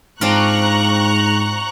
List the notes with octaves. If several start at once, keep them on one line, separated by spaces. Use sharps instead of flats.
G#2 C4 D4 F4 A#5 C#6 F#6